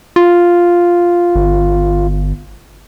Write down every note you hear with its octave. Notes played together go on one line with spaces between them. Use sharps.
F4
G1